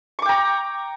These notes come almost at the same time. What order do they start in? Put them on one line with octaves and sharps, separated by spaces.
C#6 D6 G5 A#5